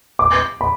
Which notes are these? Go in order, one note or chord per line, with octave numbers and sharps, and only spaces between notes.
D6
B5